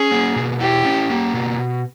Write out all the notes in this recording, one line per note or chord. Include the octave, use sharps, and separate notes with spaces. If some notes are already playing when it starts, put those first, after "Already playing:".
Already playing: C#4 G#4
A#3
B2
E4 G4
C#4
A#3
B2